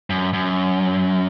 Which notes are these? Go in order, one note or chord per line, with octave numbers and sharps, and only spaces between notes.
F#2
F#2